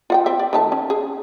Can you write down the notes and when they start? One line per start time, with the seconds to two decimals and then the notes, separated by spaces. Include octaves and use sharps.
0.10 F4 F#5 G5
0.26 C4 E5
0.39 D5
0.53 D#3 A3 A5
0.72 C#4
0.90 G#4